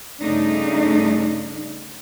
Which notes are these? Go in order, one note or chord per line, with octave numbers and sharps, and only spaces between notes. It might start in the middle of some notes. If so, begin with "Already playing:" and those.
G2 C#3 A3 D4 D#4